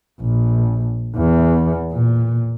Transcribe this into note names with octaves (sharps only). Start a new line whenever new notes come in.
A#1
E2
A#2